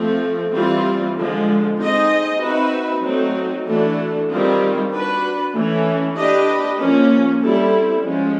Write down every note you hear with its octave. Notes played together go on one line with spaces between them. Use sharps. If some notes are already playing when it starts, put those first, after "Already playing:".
Already playing: F3 A3 C4
E3 G3 C4 F4
D3 F3 G#3
C4 D#4 G#4 C5 D#5
C4 D#4 F#4 B4 E5
F#3 A3 C4 D#4
E3 A3 D4 F#4 A4
D#3 G3 C4 F4 G#4
D4 F#4 B4
E3 A3 C#4
D4 G4 B4 D#5
F3 A#3 C#4
G3 C4 E4 A4
F3 G#3 C#4